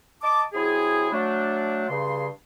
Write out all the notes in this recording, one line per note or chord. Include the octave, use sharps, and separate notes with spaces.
D#5 A5 D6
C3 F#3 E4 G#4
F#3 A3 D4
G2 C#3 C6